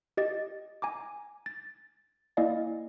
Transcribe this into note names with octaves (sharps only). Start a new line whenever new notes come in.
G4 D#5 A6
G#5 A#5 D6
A6
A#3 E4 D5 D#5 F5 G#5